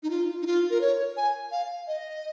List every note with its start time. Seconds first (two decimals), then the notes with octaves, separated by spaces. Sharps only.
0.03 D#4
0.10 F4
0.42 D#4
0.46 F4
0.71 A#4
0.81 C#5
1.17 G#5
1.52 F5
1.88 D#5